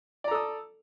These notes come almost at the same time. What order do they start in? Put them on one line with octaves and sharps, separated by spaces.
D5 A#5 A4 D#6